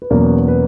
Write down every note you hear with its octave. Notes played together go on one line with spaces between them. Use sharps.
B4
E2 B2 F#3 A#3 C#4 A#4
B4